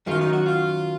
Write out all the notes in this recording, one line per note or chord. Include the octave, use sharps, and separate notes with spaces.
F#2 D#3 F#3 A#3 F4
D#4
F#4
F4